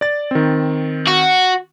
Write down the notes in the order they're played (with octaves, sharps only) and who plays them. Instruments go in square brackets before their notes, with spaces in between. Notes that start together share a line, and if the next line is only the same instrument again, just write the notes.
[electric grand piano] D5 A6
D#3 C4
[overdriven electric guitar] F#4